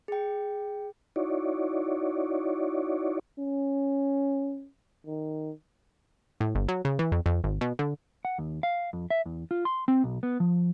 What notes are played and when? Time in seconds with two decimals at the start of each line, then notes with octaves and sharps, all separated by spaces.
0.08 G#4 G5
1.16 D#4 E4 F#4 C#5 D5
3.39 C#4
5.06 D#3
6.41 A2
6.55 G1
6.68 F#3
6.85 C#3
6.99 E3
7.12 F2
7.26 F2
7.44 G#1
7.61 B2
7.79 D3
8.25 F#5
8.38 D#2
8.63 F5
8.93 F2
9.10 E5
9.26 E2
9.51 F4
9.65 C6
9.88 C4
10.04 B1
10.23 B3
10.40 F3